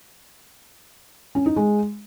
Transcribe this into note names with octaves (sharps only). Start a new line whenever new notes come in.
C#4
D#4
G#3